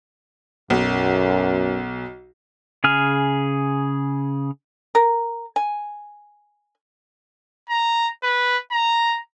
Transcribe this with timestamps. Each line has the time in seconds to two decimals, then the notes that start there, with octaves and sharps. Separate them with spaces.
0.70 B1 F#2
2.84 C#3 G#4 F6
4.95 A#4
5.56 G#5
7.70 A#5
8.23 B4
8.72 A#5